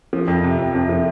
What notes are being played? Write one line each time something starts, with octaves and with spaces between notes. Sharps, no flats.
F3
F2
C3
F2
F2
F3